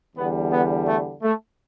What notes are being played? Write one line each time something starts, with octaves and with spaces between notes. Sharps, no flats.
E2 D3 G3 B3
B3
A3
A3